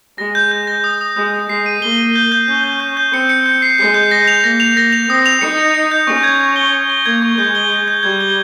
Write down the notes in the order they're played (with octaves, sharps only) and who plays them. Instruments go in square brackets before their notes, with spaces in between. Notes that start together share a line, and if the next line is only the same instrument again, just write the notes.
[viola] G#3 [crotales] A#6
[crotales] G6
G6
A#6
D#6
D#6
[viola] G#3 [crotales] D#6
[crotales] D#6
[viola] G#3 [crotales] C7
[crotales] D#7
[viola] A#3 [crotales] G7
[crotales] D#7
G6
G6
[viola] C#4 [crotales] G6
[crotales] G6
G6
G6
[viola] C4 [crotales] C#7
[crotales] C#7
G6
C7
[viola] G#3 [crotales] C7
[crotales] G6
A#6
F7
[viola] A#3 [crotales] A#6
[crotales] F7
[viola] A#3 [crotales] A#6
[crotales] F7
[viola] C4 [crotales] D#6
[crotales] F7
[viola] D#4 [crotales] C#7
[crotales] F7
C#7
G6
[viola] C#4 [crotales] C#6
[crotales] G#6
G#6
G7
C#6
C#6
[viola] A#3 [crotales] G#6
[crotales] C#6
[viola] G#3 [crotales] G6
[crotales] G7
G7
G6
[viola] G3 [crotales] G#6
[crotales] G7